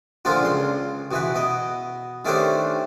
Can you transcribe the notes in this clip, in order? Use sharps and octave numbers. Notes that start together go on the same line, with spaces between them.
A#2 D3 F3 A#3 D4 F4
C#2 C6
B2 E3 B4
B2 D#5
D#3 A3 C#4 D4 G4 C5